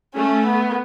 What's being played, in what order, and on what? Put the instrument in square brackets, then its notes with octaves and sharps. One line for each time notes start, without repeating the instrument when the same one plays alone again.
[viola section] A3 [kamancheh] C#4
[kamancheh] B3